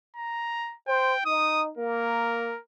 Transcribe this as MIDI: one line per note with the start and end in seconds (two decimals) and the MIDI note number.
0.16 0.75 82
0.88 1.16 72
0.88 1.22 79
1.26 1.71 63
1.26 1.62 87
1.78 2.53 58
1.78 2.61 70